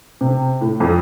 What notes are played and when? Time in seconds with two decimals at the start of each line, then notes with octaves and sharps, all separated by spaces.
0.21 C3
0.61 A2
0.80 F2